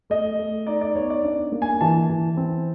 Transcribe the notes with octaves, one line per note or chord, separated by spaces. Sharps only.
A3 D#5
A3
D#4 D5
D5
B3 C#5
D5
D4 D5
A#3
G#5
E3 A5
E3
C4